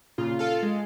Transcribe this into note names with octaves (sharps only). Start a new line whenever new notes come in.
A#2 C#3 F4
F4 A4 F5
G#3